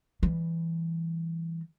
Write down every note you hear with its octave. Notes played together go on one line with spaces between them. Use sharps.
E3 G3